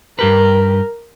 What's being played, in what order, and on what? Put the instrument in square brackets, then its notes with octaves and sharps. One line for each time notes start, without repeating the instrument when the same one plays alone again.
[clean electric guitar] G2 G4 B4 [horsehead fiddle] A#4